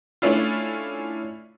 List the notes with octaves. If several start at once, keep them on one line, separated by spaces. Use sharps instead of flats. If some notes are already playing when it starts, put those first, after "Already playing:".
A3 C#4 D4 E4 F4